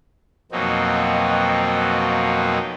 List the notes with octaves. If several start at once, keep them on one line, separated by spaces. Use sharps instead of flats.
F2 B2 F#3 A#3 C4 D#4